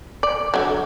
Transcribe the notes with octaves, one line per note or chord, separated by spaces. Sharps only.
D5
D3 F#3